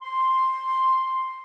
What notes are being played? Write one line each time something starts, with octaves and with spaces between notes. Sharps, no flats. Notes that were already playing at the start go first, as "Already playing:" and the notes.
C6